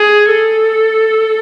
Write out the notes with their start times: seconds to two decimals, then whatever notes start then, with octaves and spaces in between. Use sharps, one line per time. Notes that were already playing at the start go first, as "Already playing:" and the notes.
Already playing: G#4
0.31 A4